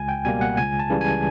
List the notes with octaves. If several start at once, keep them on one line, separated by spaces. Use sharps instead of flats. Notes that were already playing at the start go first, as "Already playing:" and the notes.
Already playing: C#2 G#5
G5
B2 G3 A#3 G#5
F#5
C#2 G#5
A5
C#3 E3 G3
G#5